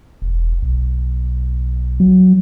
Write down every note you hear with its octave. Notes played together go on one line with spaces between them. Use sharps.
E1
B1
F#3